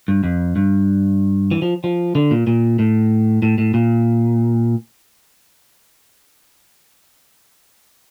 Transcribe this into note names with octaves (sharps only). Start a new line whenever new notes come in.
G2
F2
G2
E3
F3
F3
D3
A#2
A#2
A2
A2
A2
A#2